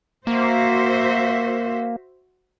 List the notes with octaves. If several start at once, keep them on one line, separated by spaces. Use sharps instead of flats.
A#3 F#4 C5 E5